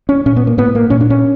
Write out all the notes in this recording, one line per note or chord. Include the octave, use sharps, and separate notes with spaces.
C#4
A#2 C#4
B3
A#3
A2 B3
A#3
A#2 C#4
D4
C#4